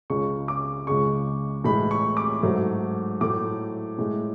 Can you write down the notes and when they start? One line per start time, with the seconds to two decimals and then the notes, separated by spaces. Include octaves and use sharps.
0.10 C#2 C#3 G#3 C#6
0.48 D6
0.87 C#2 C#3 G#3 C#6
1.64 A2 E3 G#3 B5
1.91 C#6
2.17 D6
2.43 G#2 F#3 A3
3.21 A2 F#3 A3 D6
3.99 A2 G#3